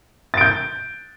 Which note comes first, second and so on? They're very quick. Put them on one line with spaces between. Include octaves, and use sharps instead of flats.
A6 D7 G6